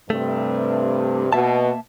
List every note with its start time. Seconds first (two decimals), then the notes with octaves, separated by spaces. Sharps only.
0.10 G2 C3 A3
1.33 B2 A#3 E5 A5